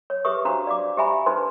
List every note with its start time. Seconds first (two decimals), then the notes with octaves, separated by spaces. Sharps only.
0.10 C#5
0.25 G4 G#4 B4 E5 C#6 D#6
0.45 D4 F#4 C5 F5 A#5
0.67 D5 F5 D6
0.97 G4 C5 E5 G#5 A#5 B5
1.26 D4 D#4 B4 C5 A5 C6